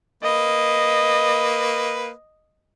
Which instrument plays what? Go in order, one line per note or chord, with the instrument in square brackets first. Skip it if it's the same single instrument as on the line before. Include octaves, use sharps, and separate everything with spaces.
[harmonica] A#3 B4 [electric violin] D#5